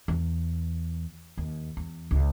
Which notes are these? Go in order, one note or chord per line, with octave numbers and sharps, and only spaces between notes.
E2
D#2
E2
C#2